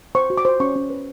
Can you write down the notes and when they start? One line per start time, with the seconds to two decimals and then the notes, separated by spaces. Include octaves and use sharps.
0.15 C5 C#6
0.30 F#4
0.38 D6
0.45 C5
0.60 C#4 C#6
0.75 C#4
0.90 B4